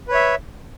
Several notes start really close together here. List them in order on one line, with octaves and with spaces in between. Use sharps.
B4 C#5 E5